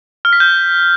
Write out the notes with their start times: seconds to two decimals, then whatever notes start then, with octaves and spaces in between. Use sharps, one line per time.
0.25 F6
0.33 B6
0.40 G6